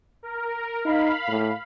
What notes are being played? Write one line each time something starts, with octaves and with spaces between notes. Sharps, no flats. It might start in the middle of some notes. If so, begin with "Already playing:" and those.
A#4
D#4 F5 B5
A2